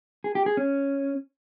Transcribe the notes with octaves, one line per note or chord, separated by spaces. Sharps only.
G#4
G4
G#4
C#4